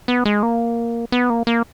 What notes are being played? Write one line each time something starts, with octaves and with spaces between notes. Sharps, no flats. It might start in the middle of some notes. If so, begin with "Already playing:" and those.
B3
G#3
A#3
B3
A#3
A#3